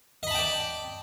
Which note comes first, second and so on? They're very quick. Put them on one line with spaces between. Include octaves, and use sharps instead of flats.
D#5 B5 A5 G5 D5